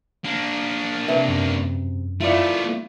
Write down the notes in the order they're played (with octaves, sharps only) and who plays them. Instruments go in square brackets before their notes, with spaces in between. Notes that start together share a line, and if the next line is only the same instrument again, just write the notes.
[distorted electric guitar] A#3 D4
[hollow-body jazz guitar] C3 B4 E5
[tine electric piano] F#2
[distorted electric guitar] A3 B3 [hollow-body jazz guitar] E4 F4 D5